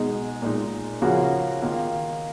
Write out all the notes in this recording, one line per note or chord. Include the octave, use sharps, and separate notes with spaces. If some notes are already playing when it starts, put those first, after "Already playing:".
Already playing: B2 G#3 D#4
A#2 G#3 D#4
C#3 F3 A#3 C#4 F#4
D#3 A#3 F4